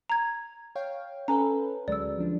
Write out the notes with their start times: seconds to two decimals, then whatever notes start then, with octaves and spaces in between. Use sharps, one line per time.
0.10 A#5 G#6
0.75 C#5 F5 G5
1.28 C#4 A4 B4 G#5 A#5
1.88 D2 F#3 G#3 D5 E6
2.18 F3 D4